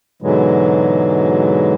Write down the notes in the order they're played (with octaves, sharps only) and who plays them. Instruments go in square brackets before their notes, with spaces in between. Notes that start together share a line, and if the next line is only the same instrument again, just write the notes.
[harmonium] G#2 B2 D3 E3 F#3 G#3